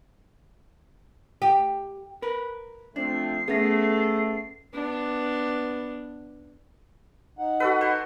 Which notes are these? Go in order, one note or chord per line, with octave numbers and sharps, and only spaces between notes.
G4
A#4 B4
F3 A3 C4 D4 C7
A3 B3 C#4 G#4 A#6
B3 D4
D#4 F#5
F#4 A4 B4
C5